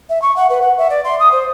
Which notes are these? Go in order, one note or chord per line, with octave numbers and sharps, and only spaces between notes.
E5
C#6
F#5
B4
F#5
E5
D5
C6
D#6
C5